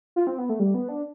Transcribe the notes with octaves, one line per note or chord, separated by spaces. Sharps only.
F4
C4
B3
A3
G3
B3
D4